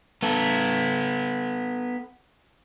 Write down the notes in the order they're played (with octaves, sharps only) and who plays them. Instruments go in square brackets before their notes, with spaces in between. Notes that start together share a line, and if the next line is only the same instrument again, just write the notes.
[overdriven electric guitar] B3 A4